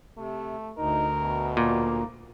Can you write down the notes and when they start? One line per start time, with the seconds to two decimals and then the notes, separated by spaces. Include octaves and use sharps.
0.17 C3 A3
0.78 D2 D#4 A#4
1.22 B2
1.57 A#2 A#3